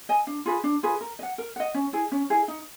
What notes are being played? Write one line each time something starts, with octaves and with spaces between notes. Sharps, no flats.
D#5 G#5
D4
F4 G#4 B4
D4
F4 G#4 B4
A#4
D#5
F#5
A#4
D#5 F#5
C#4
E4 G#4
C#4
E4 G#4
D#4